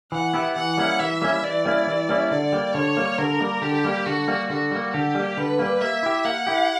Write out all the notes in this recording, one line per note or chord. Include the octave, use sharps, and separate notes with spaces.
E3 F#5
B3 E4 G4 B4
E3 F#5
G3 A#3 C#4 E4
E3 E5
G3 A#3 C#4 E4
E3 D5
G3 A#3 C#4 E4
E3
G3 A#3 C#4 E4
D3 D5
G3 A#3
D3 C#5
G3 A#3
D3 A#4
G3 A#3
D3 G4
G3 A#3
D3 F#4
G3 A#3
D3 F#4
G3 A#3
D3 G4
G3 A#3
D3 B4
G3 A#3
A#3 E5
E4 G4
A#3 F#5
E4 G4